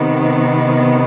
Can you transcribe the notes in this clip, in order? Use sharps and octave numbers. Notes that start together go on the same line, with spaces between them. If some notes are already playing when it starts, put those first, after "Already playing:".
Already playing: C3 D#3 B3